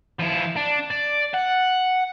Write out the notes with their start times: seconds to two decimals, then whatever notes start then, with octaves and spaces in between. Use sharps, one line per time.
0.20 F3 E4
0.56 D4
0.91 D5
1.34 F#5